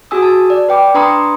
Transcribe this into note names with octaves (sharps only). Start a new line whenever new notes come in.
F#4 G#4 G#5 D#6 E6
A5
D5
B4 G5 D6
D4 B4 A#5 C6 D#6 C#7